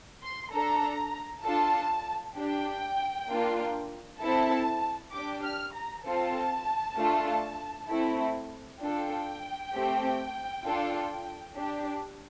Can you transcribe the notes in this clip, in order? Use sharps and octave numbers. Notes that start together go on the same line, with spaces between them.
C6
D4 A4 A#5
D4 F4 A4 A5
D4 G4 G5
A#3 D4 F4
C4 E4 A4 A5
D4 G4 D6
F6
A#5
C4 F4 A4 A5
A3 D4 F4 A4
A3 C4 E4
D4 F4 A4 G5
A3 C4 G4
D4 F4 A4
D4 G4